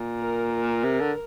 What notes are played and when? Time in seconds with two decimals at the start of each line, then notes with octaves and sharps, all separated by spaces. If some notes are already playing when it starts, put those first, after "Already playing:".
Already playing: A#2
0.20 A#4
0.52 A#4
0.84 C3
1.00 D3